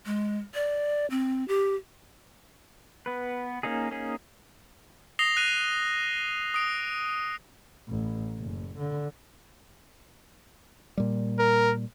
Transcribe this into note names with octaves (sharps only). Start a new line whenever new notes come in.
G#3
D5
C4
G4
B3 B4
A#3 C#4 D#4 G#4
A#3 C#4 D#4 G#4
D#6 A#6 C7 F7 G7
F#6 D#7 F7
D#6 D7
A1
F#1
D3
A#2 G3
A#4